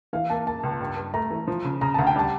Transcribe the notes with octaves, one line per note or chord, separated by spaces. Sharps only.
E3 F5
A#3 A5
A#3 A5
C#2
G2
G2
A3 A#5
E3
F3
C#3
C#3 A#5
D2 A5
G5
G3 A5